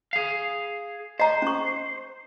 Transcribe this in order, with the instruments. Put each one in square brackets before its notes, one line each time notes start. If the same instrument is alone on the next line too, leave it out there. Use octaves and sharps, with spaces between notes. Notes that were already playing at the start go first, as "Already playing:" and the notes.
[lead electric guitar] G#4 F5
[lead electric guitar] C5 [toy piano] D#5 A#5
[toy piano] C#4 C#6